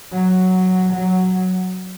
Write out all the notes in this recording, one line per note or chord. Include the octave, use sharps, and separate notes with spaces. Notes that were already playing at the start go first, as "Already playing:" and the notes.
F#3
F#3